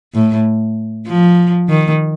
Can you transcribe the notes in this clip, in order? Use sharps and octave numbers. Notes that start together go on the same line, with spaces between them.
A2
F3
D#3